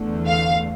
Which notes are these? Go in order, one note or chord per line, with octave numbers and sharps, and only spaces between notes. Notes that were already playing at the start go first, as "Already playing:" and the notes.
Already playing: E2 D3 A3
F5